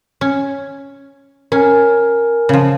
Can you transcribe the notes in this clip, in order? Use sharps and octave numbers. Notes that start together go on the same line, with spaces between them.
C#4
C#4 A#4 G#5
C#3 F3